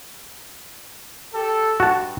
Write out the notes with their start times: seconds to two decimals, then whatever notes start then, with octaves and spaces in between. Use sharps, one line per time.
1.33 G4 A4
1.80 G2 F#4 A5